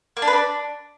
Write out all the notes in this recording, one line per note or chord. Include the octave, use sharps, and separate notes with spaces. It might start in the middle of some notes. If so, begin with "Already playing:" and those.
A#3
D4
B4
D4